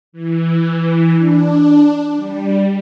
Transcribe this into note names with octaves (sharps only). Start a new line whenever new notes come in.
E3
D4
G3